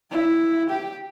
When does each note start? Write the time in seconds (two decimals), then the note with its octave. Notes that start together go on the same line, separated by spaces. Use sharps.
0.11 E4
0.69 G4